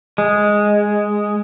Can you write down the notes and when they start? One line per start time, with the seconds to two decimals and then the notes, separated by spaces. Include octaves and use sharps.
0.18 G#3